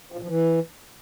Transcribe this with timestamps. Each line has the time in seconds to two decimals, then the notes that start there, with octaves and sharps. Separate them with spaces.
0.12 F3
0.17 A#2
0.22 F3
0.28 E3